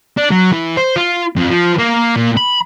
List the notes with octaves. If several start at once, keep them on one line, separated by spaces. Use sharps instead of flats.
D4
F#3
E3
C5
F4
F2
F3
A#3
A#2
B5